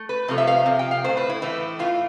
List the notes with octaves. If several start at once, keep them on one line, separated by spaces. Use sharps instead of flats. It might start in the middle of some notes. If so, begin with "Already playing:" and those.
Already playing: A3
B4
C3 F3 A3
E5
F5
C3 F3
G5
F5
A2 E3 A3 C5
B4
E4
A2 E3 A3 E4
A2 E3 A3 F4